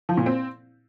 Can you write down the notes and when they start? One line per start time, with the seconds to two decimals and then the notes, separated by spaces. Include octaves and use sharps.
0.09 F3
0.17 A#2
0.26 C4